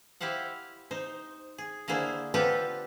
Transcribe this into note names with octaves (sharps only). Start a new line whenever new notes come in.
E4 G4 C5 F5 F#5
D#4 C5
G#4
D3 A#3 E4 G#4 C5
B3 F4 G4 A4 B4 C5